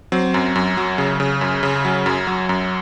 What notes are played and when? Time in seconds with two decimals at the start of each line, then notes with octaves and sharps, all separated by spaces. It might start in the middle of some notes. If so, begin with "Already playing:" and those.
0.12 F#3 C4
0.34 F#2
0.55 F#2
0.77 F#3
0.98 C#3
1.20 C#3
1.41 F#2
1.63 C#3
1.85 F#3
2.06 F#2
2.27 F#3
2.49 F#2